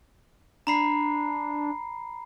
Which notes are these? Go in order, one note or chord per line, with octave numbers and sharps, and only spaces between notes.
D4 A#5 B5 C7